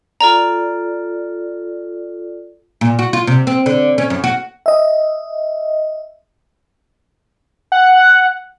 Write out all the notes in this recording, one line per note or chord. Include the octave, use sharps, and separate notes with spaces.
F4 A4 D5 A#5
A#2
F#4
F4
C3
C4
D3
C#4
F#2
F#4
D#5 E5
F#5